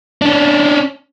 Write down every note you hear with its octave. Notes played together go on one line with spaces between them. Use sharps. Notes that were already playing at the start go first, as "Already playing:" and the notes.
C#4 D4